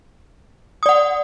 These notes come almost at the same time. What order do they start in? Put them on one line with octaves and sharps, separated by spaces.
D#6 D5 F#5